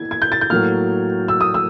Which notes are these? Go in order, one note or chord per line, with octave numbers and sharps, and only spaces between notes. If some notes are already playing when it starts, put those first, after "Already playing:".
Already playing: E3 G#6
G#6
G6
A6
G6
A2 F#3 A#3 F6
E6
D#6
E6